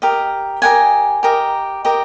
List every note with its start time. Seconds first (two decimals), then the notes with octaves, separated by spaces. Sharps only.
0.02 G4 A#4 D#5
0.62 G4 A#4 D#5 F#5 G#5
1.23 G4 A#4 D#5
1.85 G4 A#4 D#5